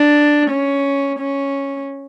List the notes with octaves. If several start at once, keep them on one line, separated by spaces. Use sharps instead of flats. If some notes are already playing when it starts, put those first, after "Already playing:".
Already playing: D4
C#4
C#4